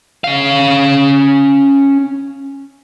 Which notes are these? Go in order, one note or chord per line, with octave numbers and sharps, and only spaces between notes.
C#4 F5